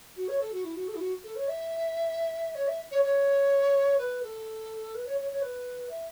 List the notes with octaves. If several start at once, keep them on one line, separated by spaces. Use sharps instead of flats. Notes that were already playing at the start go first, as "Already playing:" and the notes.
F#4
C#5
A4
F#4
E4
F#4
A4
E4
F#4
A4
C#5
E5
C#5
E5
C#5
C#5
B4
A4
B4
C#5
C#5
C#5
B4
E5